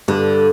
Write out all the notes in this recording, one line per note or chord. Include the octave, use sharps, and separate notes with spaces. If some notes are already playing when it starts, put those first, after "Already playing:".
G2 D3